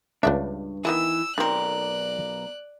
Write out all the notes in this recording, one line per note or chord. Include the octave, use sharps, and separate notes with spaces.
C#2 G2 D4 B4 D5 E5
D#3 E3 B3 E4 E6
B1 D#3 C4 A#4 D5 F#6